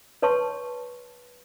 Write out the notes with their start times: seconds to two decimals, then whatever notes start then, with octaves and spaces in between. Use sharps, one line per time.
0.22 B4 C#5 A5 C6 C#6